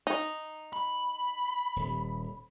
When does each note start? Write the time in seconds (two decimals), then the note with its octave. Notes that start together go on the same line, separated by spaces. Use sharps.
0.07 D#4
0.73 B5
1.76 D#1